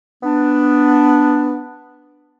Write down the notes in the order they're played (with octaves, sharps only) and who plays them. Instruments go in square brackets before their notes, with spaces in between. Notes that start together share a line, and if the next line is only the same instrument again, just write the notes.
[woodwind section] B3 D4